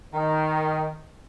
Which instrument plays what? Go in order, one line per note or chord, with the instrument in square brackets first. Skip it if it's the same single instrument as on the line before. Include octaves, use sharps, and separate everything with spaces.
[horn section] D#3